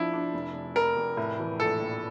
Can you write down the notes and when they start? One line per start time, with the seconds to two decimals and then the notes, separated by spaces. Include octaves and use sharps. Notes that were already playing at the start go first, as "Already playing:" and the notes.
Already playing: F3 D4 E4
0.13 D4
0.33 F1
0.54 F1
0.75 F1 A#4
0.96 F1
1.17 A2
1.39 E3
1.60 A#1 A4
1.80 A#1